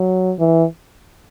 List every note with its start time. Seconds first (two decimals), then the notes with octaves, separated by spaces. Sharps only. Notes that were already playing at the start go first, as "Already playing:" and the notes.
Already playing: F#3
0.39 E3